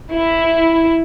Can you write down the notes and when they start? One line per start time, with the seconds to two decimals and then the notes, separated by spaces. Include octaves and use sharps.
0.14 E4